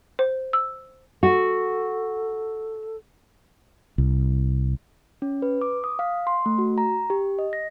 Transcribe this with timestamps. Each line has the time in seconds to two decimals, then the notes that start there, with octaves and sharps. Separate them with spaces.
0.19 C5
0.53 E6
1.23 F#4 A4
3.98 C2
5.22 C#4
5.42 B4
5.61 D6
5.84 D#6
5.99 F5
6.27 C6
6.46 A3
6.58 F#4
6.78 A#5
7.10 G4
7.39 D#5
7.53 A#6